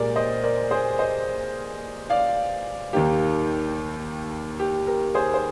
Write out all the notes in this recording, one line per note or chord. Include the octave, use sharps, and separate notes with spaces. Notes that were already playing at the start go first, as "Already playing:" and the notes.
Already playing: A#2 G#3 G4 A#4 D5
C5 D#5
A#4 D5
G#4 C5
C5 D#5
D5 F5
D#2 D#3 A#3 G4
G4
G4 A#4
G#4 C5
C5